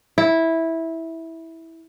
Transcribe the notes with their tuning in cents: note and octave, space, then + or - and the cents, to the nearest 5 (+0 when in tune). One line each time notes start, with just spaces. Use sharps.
E4 -10